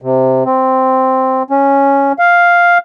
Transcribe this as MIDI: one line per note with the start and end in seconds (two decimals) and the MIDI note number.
0.02 0.44 48
0.46 1.43 60
1.50 2.12 61
2.19 2.78 77